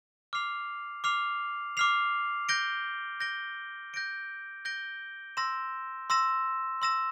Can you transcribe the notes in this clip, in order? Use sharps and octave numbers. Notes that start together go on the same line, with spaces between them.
D6 F6 C7 F7
D6 F6 C7 F7
D6 F6 C7 F7
G6 A#6 D7 G7
G6 A#6 D7 G7
G6 A#6 D7 G7
G6 A#6 D7 G7
C6 E6 A#6 E7
C6 E6 A#6 E7
C6 E6 A#6 E7